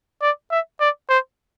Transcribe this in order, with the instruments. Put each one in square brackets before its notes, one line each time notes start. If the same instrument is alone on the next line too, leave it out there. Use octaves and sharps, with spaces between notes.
[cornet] D5
E5
D5
C5